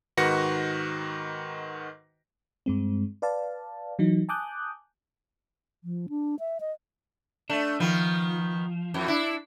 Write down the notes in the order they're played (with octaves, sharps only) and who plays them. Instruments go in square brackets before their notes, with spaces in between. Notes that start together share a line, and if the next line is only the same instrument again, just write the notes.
[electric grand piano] G#2 D#3 F#4 B4 A#6 C#7
[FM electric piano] G2 G#3 C4
B4 D5 F5 A5
E3 F#3 D#4
G#5 A5 D6 D#6 F#6 G6
[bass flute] F3
D4
E5
D#5
[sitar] A3 [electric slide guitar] D4
[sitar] D#3 B3 [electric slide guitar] F3
[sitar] F2 E3
D4 E4